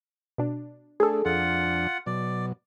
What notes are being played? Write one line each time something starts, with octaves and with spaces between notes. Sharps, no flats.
B2 D4
A3 D4 G#4 A4
F2 D4 F4 F#5
B2 F#3 D5